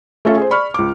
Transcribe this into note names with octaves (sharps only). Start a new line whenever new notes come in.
A3 C#4 F4 A4 E5
G#4 C5
D5 B5 C#6 F6
C#2 D6